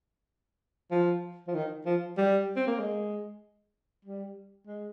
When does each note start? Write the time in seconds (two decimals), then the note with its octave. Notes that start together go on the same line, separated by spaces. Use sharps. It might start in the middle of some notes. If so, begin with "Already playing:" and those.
0.91 F3
1.47 F3
1.54 D#3
1.86 F3
2.17 G3
2.56 C4
2.67 A#3
2.80 G#3
4.05 G3
4.67 G#3